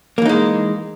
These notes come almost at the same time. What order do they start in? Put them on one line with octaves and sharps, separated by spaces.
A#3 E3 D#4 G#3